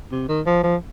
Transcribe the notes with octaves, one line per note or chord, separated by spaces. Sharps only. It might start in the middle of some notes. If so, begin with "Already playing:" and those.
C3
D#3
F3
F3